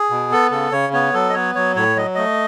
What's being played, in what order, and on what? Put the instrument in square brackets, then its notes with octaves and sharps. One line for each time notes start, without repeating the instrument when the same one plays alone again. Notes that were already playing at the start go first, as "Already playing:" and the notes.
Already playing: [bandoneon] G#4
B2
B3 A4
C#3 A4
C#3 C#5
B3 C#5
F#3 A4
D#5
B3 C#5
F#3 C#5
A2 C#5
F#3 D#5
A3 D#5